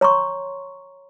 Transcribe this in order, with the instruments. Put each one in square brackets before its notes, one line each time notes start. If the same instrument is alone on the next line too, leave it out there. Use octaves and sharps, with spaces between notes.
[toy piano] C#5 A#5 C6 C#6